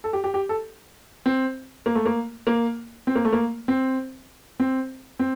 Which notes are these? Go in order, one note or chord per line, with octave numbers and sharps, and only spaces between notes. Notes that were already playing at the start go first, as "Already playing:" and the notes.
A4
G4
G4
G4
A4
C4
A#3
A3
A#3
A#3
C4
A#3
A3
A#3
C4
C4
C4